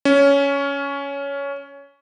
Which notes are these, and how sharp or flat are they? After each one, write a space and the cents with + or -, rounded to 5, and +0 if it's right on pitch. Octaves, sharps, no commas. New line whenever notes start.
C#4 +15